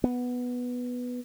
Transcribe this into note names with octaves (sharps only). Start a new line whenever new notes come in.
B3